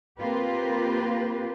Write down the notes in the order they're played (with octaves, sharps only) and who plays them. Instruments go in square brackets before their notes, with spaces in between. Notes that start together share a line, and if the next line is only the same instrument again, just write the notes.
[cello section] A#3 C4 F4 G4 A#4 B4